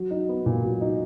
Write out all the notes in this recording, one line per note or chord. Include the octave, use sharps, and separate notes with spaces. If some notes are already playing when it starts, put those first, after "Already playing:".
Already playing: F#3
D#4
B3
A#2
F#3
D#4